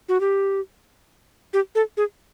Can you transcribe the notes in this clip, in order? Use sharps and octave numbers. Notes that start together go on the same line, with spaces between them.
F#4
G4
G4
A4
G#4